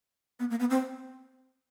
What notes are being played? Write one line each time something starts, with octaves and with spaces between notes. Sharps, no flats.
B3
A#3
B3
C4